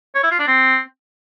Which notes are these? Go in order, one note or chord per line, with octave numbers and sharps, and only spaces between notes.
C#5
E4
F4
D4
C4